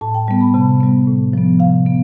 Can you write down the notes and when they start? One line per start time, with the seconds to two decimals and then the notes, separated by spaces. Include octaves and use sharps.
0.01 A2 A5
0.14 G5
0.27 G3 B3 A5
0.41 B5
0.54 C3 A5
0.81 G3 B3
1.07 A2
1.33 F3 B3
1.60 C3 F5
1.86 B3